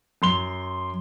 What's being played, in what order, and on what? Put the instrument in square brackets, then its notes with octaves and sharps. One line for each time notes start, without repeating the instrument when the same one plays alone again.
[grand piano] F#2 C6 G7